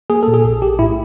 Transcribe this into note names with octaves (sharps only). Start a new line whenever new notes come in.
A#3 G#4
A#2 A4
G#4
A#1
A#1 G4
A2 E4